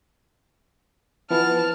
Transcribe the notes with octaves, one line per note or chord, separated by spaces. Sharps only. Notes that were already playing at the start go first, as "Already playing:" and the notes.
E3 F3 B3 A5 F6